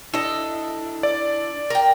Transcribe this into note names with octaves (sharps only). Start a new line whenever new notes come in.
D4 E4 A4 D#5
D5
A#4 G5